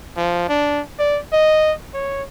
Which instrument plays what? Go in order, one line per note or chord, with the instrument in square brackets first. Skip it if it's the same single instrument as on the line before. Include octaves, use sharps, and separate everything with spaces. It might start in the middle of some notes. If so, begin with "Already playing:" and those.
[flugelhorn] F3
D4
D5
D#5
C#5